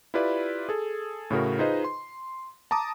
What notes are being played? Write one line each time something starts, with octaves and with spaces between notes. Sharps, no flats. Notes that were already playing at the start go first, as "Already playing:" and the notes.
E4 F4 G4 B4 D5 B5
G#4 A4
A2 C#3 F#4 A#4
D#4 F4 G#4 B4 C5 D#5
C6
A5 A#5 D6 D#6